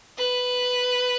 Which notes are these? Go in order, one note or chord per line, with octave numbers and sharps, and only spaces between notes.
B4